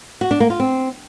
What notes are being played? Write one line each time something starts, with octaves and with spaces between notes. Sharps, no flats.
F#4
D4
A#3
F4
C4